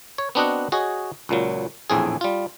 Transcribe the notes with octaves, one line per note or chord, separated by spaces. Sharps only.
C#5
B3 C4 D4 F#4 D#5 F#5
F#4 G#4 C#5 D#5
C#2 A#2 F#3
A#1 E2 A2 C4 G#4
G3 F4